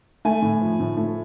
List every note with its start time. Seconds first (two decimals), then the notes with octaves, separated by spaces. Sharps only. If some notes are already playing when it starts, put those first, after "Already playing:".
0.25 A3 G#5
0.42 A2
0.61 F3
0.80 A2
0.97 A3